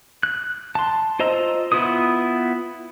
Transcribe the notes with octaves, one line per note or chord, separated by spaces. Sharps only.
F#6
A5 C6
F4 C5 D#5 A#5 E6
B3 E4 F4 B4 D#6